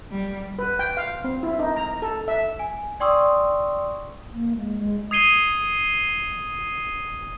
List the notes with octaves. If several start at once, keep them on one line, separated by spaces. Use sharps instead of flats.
G3
B4
G5
F5
C4
E4
D#4
A#5
A4
E5
G#5
D5 G5 C6 C#6 D#6 E6
A#3
G#3
G#3
D#6 G#6 C7 D#7 G7